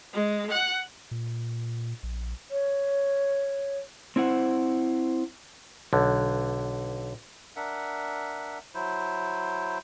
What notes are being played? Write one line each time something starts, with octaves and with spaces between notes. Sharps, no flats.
G#3
F#5
A#2
A#1
C#5
C4 E4 C5 F#5
B1 D3
D4 A#4 E5 F#5
F#3 E4 C5